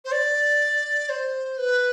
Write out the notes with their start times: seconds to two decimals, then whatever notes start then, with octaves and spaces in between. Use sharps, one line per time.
0.05 C5
0.12 D5
1.09 C5
1.58 B4